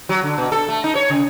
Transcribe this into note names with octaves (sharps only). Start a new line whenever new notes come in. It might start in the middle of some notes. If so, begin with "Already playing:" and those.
F#3
D3
B2
A4
A3
D#4
C#5
C#3